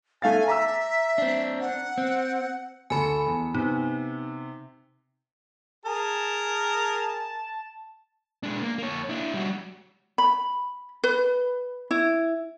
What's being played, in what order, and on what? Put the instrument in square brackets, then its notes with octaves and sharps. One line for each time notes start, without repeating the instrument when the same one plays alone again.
[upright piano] A3 F5 A6 [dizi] G#5
[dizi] E5 [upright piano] A#5 D6 E6
[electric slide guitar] C4 D4
[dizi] F#5
[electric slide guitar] C4
[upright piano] D2 A4 C#7 [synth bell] G#5 B5
[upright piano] E2
[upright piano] C3 B3 [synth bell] D#4
[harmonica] G#4 A#4 [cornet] A5
[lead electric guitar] G#3 D4
A#3
A#3 C#5
D4 E4
G3 F#4
[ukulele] B5
B4
E4